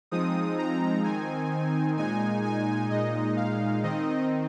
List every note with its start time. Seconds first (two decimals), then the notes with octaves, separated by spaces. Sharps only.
0.11 F3 G#3 C4 D#4 D#6
0.58 A#5
1.04 D#3 C4 D#4 G#5
1.97 A#2 G#3 D#4 G#5
2.44 G#5
2.90 A#2 G#3 D#4 D#5
3.37 F5
3.83 D#3 C4 D#4 D#5